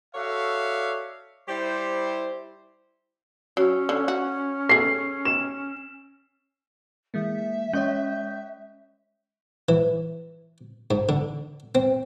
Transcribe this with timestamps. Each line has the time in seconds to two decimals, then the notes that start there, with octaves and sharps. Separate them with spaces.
0.15 F#4 A4 C#5 D5 E5 F5
1.49 G3 E4 G4 C5
3.57 F#3 C#4
3.89 D3
4.08 F#4
4.69 G#4 A4 C7
5.25 E7
7.14 E3 G#3 A#3 E5
7.73 G#3 C#4 C#5 D#5 G6
9.69 E3
10.91 G#2
11.09 D3
11.75 C4